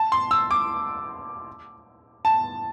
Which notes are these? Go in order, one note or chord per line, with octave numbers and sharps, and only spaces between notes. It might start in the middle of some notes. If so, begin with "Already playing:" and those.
Already playing: A5
C6
E6
D6
A5